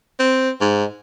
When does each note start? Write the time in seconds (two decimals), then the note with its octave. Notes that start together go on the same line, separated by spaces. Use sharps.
0.20 C4
0.61 G#2